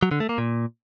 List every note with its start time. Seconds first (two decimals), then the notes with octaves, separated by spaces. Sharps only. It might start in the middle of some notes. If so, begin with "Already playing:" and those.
0.03 F#3
0.11 D3
0.20 A3
0.29 A#3
0.38 A#2